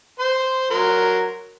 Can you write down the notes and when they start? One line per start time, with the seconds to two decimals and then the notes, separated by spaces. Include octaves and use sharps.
0.20 C5 C6
0.71 F#3 A#4 C6